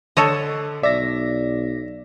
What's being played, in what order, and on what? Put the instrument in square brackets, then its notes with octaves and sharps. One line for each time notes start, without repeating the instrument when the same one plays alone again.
[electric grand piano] D3 [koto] A4 C#5 D#5
[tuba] B1 [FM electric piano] D5 A#6 [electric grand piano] E5